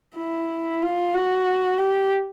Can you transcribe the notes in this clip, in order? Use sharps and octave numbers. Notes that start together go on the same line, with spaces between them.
E4
F4
F#4
G4